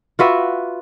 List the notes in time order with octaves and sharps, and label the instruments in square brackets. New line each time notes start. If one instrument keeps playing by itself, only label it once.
[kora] F4 F#4 B4 E5